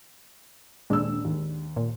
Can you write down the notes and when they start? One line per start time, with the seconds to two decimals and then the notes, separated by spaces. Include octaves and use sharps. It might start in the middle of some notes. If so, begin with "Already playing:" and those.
0.90 D#1 G#3 D4 E6
1.25 D#2
1.76 A#2